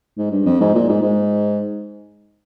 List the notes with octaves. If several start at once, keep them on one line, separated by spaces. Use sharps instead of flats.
G#2
G2
F2
G#2
A#2
G#2
G#2